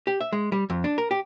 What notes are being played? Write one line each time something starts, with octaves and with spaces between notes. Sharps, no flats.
G4
E5
G#3
G3
F2
D4
A#4
G4